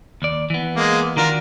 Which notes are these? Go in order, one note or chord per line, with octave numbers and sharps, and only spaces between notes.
D#2 D5
E3 B3
G#3 A#3
D#3 D4 F4 F#4 A#4